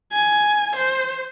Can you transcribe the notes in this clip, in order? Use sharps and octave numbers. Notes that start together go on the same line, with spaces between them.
G#5
C5